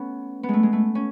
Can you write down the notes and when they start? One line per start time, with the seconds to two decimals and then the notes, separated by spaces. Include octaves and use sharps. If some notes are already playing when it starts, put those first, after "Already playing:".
Already playing: A3 B3 C#4
0.43 B3
0.48 G#3
0.54 A3
0.63 G#3
0.73 A3
0.95 C#4